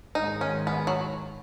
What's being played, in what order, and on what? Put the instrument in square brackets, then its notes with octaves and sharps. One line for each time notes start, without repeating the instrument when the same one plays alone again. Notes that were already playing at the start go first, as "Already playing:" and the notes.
[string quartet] G#2 D#3 G#3 [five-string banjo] D#4
[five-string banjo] C#4
B3
F#3